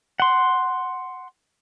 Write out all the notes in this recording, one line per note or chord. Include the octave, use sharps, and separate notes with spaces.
F#5 C6